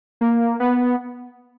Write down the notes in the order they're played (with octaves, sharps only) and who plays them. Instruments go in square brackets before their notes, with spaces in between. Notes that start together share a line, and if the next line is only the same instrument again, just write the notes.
[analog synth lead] A#3
B3